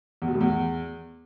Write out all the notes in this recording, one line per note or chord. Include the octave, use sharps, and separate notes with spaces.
E2
B2
A2
E2